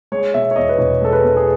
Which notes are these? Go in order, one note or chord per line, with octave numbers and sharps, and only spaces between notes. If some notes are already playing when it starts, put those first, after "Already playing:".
G#3 C#5
B2 E5
C#5
E2 D#5
B4
E1 C#5
G#3 A4
B4
B2
G#4